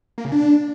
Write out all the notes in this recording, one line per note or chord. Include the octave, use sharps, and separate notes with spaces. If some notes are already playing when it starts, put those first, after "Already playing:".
A#3
C#3
D4